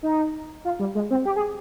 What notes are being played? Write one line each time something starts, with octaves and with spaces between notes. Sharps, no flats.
D#4
F4
G3
G#3
C4
G4
G#4